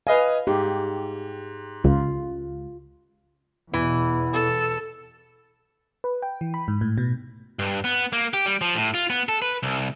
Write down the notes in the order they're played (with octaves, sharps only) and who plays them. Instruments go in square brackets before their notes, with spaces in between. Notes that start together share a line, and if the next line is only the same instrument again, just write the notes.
[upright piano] B4 D#5 G#5 [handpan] F5
[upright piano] G#2 [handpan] G4
[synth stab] C#2 [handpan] F4
[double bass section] E2 B2 [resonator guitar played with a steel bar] E3
[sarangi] A4
[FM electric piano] B4
G5
E3
B5
G#2
A2
B2
[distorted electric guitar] G2
B3
A#3
G4
G3
F3
A2
F4
B3
A4
B4
C2